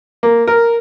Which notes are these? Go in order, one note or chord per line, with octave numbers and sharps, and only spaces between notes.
A#3
A#4